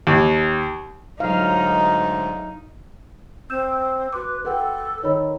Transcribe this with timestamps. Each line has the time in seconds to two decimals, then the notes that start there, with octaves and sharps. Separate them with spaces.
0.07 D#2
1.20 D2 G#2 F#3 D#4 F5
3.50 C4 E6 G6 E7
4.13 F#4 B4 C6 D6
4.45 A4 B4 F#5 G5
5.03 D#3 D#4 C#5 B5